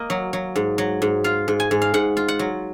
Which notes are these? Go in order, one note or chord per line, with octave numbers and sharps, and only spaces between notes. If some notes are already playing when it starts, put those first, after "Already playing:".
Already playing: A#3 D#5
F#3
F#3
G#2
F#3
G#2
F4 F5
G#2
G#5
G#2
F5
G#2 F#5
F4
F#5
F#3